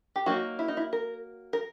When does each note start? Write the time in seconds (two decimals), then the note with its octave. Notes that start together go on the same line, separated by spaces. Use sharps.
0.16 G4
0.26 F#3 A#3 D#4 F#4
0.59 E4
0.68 D#4
0.77 E4
0.93 A#4
1.53 A#4